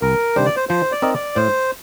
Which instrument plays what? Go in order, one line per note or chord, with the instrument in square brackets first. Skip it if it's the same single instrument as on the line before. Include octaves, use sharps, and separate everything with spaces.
[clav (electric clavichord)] C2 [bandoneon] A#4
[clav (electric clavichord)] C3 D#3 G3 D4 [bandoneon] C5
[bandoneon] D5
C5
[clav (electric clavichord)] F3 [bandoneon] C5
[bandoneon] D5
[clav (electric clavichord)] C4 D#4 A#4 D#5
[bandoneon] D5
[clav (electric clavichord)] A2 [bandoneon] C5